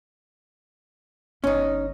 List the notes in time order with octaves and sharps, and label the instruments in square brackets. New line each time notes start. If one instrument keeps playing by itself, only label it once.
[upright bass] G1 [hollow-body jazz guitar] C#4 D#4